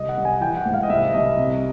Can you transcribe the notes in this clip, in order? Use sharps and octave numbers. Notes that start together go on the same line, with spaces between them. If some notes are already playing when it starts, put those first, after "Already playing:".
Already playing: C2 D#5
F#5
C2
G#5
E3 G5
F#5
G#2
F5
D#5
C2 E5
C2 D#5
C3